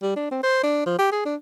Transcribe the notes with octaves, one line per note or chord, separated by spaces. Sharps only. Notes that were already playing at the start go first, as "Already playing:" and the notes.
G3
D4
C4
C5
D4
F3
G4
G#4
D4